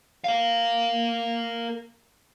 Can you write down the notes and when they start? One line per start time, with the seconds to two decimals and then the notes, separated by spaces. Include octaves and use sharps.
0.24 A#4 F5